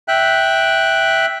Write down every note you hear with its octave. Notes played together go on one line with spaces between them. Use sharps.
E5 G5 F#6